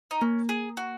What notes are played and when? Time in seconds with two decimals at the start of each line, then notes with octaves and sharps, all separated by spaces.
0.11 D#4
0.21 A#3 C#4
0.49 G#4
0.77 F#4